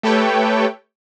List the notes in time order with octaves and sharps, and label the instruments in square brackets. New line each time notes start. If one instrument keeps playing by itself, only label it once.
[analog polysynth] A3 G4 A4 B4 C#5 G5